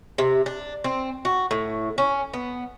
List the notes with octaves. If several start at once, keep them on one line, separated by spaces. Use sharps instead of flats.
C3
D4
C4
F#4
A2
C#4
B3